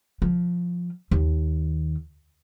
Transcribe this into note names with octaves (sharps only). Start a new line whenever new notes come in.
F3
D#2